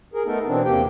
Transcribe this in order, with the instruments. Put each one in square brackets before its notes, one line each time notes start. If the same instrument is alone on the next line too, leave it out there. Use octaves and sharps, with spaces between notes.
[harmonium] G#4 A#4
A3 B3 D#4 A4 A#4
B2 E3 C4 D4
E2 C3 A#3 G4 G5